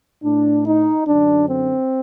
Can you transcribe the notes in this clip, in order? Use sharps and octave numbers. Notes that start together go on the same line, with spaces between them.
A2 D4
D#4
F#2 D3 D4
C4